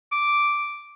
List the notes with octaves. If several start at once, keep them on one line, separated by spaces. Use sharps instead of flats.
D6